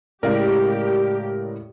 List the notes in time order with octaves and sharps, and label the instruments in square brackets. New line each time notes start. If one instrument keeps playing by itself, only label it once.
[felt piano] A2 C#3 G#3 [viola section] G4 [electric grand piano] A#4 D5 F5